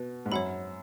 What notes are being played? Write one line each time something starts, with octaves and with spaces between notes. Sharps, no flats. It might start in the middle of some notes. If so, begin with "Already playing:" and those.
Already playing: B2 B4
G#2
F#2 C#5 F#5 B5